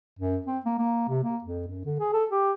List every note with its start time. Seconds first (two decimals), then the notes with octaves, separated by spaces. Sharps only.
0.19 F#2
0.46 C4
0.65 A#3
0.79 A#3
1.09 C3
1.24 A#3
1.44 F2
1.67 F#2
1.85 D3
2.00 G#4
2.13 A4
2.31 G4